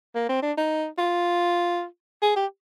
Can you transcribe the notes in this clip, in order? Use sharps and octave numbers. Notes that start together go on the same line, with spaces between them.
A#3
C4
D4
D#4
F4
G#4
G4